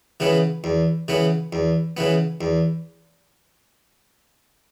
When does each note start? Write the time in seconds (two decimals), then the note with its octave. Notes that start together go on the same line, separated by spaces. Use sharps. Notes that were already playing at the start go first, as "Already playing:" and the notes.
0.20 C#3 E3 B3
0.64 E2
1.08 C#3 E3 B3
1.53 E2
1.97 C#3 E3 B3
2.41 E2